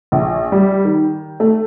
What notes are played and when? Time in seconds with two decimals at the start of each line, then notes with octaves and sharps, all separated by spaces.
0.12 A#1
0.52 G3
0.85 D#3
1.40 A3